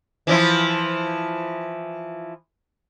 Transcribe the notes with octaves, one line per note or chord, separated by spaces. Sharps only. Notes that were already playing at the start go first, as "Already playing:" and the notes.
E3 F3 E4